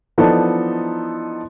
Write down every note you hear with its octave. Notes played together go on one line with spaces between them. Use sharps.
E3 F3 B3 D4 D#4 A4